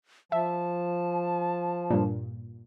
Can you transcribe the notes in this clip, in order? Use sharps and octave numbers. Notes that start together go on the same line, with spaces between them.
F3 E5 A5
G2 A#2